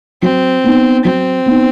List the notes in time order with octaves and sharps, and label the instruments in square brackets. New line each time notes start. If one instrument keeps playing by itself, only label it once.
[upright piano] F#3 [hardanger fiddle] C4
[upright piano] B3 D#4
[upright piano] F#3 [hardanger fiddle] C4
[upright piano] B3 D#4